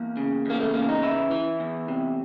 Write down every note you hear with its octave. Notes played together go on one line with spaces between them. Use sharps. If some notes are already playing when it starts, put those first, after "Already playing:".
Already playing: E2 A#3
C#3
E2 A#3
A3
C#3 A#3
D#4
E3 E4
E3
E2
C3